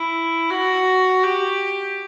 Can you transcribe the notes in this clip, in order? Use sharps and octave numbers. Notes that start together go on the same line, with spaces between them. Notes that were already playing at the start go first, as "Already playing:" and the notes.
Already playing: E4
F#4
G4